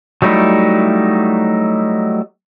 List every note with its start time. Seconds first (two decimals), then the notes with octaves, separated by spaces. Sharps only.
0.22 F#3 G3 A3 D#4 E4